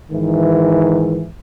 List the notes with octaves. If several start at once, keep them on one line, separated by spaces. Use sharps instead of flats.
G#2 D#3 E3